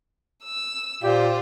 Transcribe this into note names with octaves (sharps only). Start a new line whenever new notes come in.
E6
A#2 F4 G4 C5